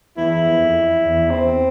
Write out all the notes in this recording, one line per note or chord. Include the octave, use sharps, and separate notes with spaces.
E2 E4
F2
E2
C4